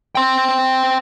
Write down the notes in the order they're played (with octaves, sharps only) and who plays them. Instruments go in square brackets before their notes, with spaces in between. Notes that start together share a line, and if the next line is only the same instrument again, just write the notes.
[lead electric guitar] G5 C6